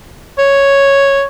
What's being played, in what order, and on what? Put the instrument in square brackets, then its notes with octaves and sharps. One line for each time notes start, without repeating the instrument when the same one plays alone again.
[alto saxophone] C#5